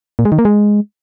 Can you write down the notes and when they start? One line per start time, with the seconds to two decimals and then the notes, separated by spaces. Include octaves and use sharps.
0.19 A#2
0.25 G#3
0.32 D#3
0.38 A#3
0.45 G#3